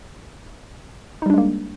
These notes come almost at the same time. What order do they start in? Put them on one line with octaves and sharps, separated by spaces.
D#4 G3 D4 G#3 A#3